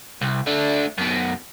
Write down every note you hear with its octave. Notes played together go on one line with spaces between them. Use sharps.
C2
A3 D4
F#2 B2